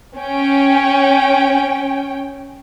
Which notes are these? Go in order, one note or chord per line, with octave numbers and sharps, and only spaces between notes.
C#4 G5